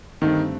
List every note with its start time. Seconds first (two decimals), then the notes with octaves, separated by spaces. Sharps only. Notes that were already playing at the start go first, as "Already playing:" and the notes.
0.21 G2 D3 D#3 A3 C4